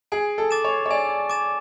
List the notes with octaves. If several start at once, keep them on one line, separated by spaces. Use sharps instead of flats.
G#4 G#5
A4
D6 A6 E7
C#5
C#5
D5 G#5
D6 A6 E7